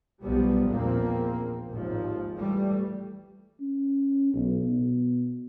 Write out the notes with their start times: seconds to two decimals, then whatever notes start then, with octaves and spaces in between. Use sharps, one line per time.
0.22 B1 F3 G3 B3
0.67 A#1 E2 F3 A#3 C4
1.70 G#1 D#2 F3
2.36 E3 G3 A3
3.60 C#4
4.34 B1
4.63 B2